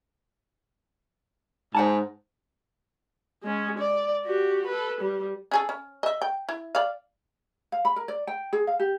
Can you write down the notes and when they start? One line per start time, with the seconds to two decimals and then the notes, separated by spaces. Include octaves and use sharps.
1.75 G#2 C5 F#5 A5
3.43 G#3 C#4
3.78 D5
4.25 F#4 G4
4.67 A4 B4
5.01 G3
5.51 C#4 G#4 A4
5.69 C#4
6.03 D#5 E5
6.22 G5
6.49 E4
6.75 D5 F5
7.72 F5
7.85 B5
7.96 A#4
8.08 D5
8.27 G5
8.53 G#4
8.67 F5
8.80 G4